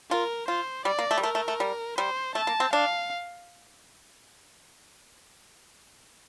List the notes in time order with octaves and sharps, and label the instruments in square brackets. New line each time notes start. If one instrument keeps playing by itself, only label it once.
[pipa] F4 [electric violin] A#4
[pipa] F4 [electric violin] C5
[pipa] G3 [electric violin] D5
[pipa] A#3
A3
G3
[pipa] A3 [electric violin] A#4
[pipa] A3
A3
G3
[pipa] G3 [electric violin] C5
[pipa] A3 [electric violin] A5
[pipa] A#3
C4
[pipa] D4 [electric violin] F5